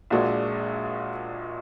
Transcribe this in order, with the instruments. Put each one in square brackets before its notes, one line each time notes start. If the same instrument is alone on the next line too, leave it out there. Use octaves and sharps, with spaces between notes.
[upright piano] A#1 A#2 G#3 D4 F#4